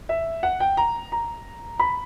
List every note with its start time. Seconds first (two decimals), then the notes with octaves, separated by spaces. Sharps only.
0.09 E5
0.43 F#5
0.60 G5
0.77 A#5
1.12 A#5
1.80 B5